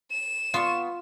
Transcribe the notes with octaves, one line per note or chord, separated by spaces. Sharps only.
E7
B3 F4 C6 C#6